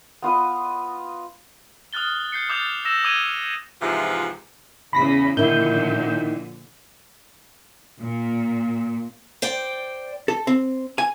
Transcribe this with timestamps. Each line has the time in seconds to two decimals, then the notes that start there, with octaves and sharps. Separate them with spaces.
0.22 B3 F4 B4 D#5
1.93 D#6 F6 F#6 A6 G7
2.32 G6 C7 C#7
2.49 D6 D#6 F#6 G6 A6 F7
2.85 E6 A#6 E7
3.04 D6 D#6 G#6 D#7 F7 G7
3.80 G#2 C3 E3 F3 F4
4.93 E2 C#3 B5 A#6 B6
5.37 A#2 D3 D#3 F3 E4 G6
8.01 A#2
9.42 C5 D5 G5
10.28 A4
10.47 C4
10.98 G#5